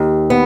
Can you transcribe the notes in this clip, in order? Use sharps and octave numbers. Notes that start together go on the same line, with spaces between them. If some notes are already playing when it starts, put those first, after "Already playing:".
Already playing: D#2
B3